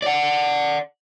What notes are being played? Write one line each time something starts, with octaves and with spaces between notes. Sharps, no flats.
D5 F#5